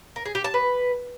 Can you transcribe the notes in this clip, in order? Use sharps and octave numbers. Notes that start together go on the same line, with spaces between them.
A#4
G#4
G4
A5
B4